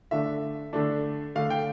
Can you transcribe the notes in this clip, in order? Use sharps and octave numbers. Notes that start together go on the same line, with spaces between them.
D3 A3 D4 E5
D3 A3 D4
D3 A3 D4 F5
G5